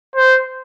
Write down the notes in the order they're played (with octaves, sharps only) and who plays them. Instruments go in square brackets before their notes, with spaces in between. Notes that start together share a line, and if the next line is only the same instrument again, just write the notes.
[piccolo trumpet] C5